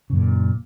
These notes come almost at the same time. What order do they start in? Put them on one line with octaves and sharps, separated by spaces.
C#3 F#2 A#2